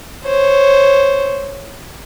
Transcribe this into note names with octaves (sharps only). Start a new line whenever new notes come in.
C5 C#5